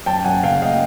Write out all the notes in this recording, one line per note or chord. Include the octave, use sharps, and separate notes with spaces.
F#2 G5 A5
F#2 F#5 G#5
C#3 F5 G5
D#5 F5